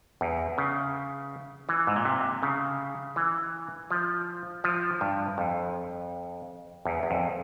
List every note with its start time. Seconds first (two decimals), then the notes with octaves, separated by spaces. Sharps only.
0.21 E2
0.58 C#3
1.69 E3
1.87 G#2
1.96 A#2
2.05 C3
2.43 C#3
3.16 E3
3.91 F3
4.64 F3
5.01 G2
5.38 F2
6.85 E2
7.03 E2
7.11 F2